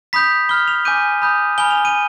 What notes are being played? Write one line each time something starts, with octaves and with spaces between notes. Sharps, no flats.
B5 D#6 G6 B6
B5 F6 G7
F7
G#5 D6 G6 D#7
B5 D#6 G6
G#5 B5 F6 G7
F7
D#7